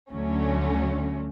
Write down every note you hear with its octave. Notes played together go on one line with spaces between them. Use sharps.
D2 D3 F#3 A3 C#4